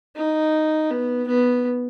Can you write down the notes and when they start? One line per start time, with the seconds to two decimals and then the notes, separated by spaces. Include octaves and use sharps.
0.16 D#4
0.91 B3
1.27 B3